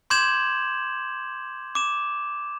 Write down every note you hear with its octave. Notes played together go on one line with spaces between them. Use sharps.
C6 D6 G6 G#6 E7 F#7
D6 E7